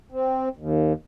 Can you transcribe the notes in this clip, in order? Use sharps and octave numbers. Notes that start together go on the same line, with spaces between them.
C4
D#2